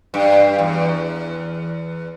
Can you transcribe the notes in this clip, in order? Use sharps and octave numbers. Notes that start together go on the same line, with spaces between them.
G2
E2